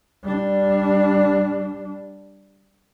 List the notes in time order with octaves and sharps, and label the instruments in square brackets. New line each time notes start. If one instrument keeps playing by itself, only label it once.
[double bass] G3 D4